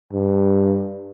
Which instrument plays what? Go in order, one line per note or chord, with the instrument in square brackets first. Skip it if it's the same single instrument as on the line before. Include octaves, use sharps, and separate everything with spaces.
[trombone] G2